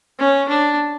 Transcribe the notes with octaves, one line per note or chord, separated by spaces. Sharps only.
C#4
D4